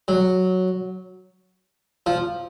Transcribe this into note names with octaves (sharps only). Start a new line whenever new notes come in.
F#3
F3